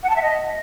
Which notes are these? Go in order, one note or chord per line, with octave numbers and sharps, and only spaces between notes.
F#5
A5
E5
D#5